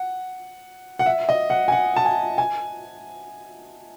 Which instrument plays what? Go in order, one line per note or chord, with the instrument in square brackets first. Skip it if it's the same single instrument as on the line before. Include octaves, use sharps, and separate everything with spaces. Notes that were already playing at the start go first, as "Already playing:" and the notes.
Already playing: [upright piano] F#5
F#5
E5
D#5
F#5
G#5
F#5
A5
G#5
G#5